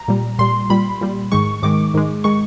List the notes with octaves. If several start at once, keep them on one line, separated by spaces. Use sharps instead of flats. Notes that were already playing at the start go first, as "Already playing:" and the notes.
Already playing: A#5
A#2 G3
A#2 G3 C6
A#2 G3 B5
A#2 G3
G#2 D#3 G#3 C#6
G#2 D#3 G#3 D6
G#2 D#3 G#3
D#3 G#3 C#6